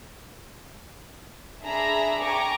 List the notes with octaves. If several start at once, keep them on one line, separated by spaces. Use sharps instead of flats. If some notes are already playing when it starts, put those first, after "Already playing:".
D4 G#4 E5 A#5 B5
G5 G#5 A#5 C#6 D6